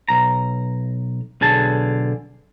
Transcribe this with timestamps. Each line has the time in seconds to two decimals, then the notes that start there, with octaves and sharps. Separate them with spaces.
0.09 B1 A#5
1.41 B1 D3 G#4 A5